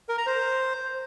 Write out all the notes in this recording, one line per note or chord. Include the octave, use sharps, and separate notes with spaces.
A#4
A#5
C5